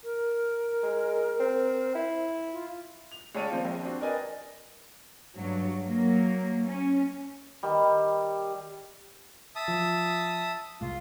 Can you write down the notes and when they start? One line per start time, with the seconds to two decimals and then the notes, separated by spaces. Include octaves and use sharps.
0.04 A#4
0.83 G#3
1.40 C4
1.95 E4
2.53 F4
3.12 F7
3.35 C#2 C#5 D5 F5 A5 D#7
3.50 A#2 F3 C4 C5
3.65 A#1
3.83 C4 D4 F#4
4.01 A#4 B4 D5 D#5 G5 G#5
5.35 G2 F#3
5.83 F#3 A#3
6.66 C#4
7.63 D#3 G3
9.56 E5 A5 D#6
9.68 F3
10.81 C2 G#2 F4